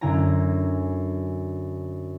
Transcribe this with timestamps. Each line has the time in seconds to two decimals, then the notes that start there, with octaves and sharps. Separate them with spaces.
0.01 F#2 D3 E4 G#5 A#5